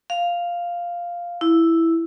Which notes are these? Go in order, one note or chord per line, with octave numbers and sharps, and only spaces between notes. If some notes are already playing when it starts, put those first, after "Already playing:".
F5
E4